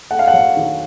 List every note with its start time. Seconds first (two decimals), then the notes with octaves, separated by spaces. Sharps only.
0.11 A3 F#5
0.19 F5
0.28 F#5
0.34 F#3
0.57 D#3